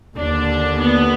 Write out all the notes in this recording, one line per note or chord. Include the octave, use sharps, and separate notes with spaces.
D#2 D3 D4
B3